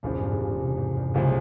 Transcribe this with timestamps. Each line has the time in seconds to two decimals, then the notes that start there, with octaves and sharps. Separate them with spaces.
0.03 E1 E2 A#2 C#3 F3
0.17 G2
0.31 G#2
0.45 A#2
0.59 C3
0.77 G#2
0.96 G2
1.14 C2 A#2 C#3 F3 G#3